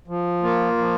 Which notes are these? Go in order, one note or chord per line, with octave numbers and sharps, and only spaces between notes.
F3
A#3 F4
F3